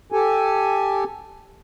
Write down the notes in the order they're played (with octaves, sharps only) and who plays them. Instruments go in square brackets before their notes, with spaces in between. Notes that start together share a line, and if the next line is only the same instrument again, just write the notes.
[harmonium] G4 A4 G#5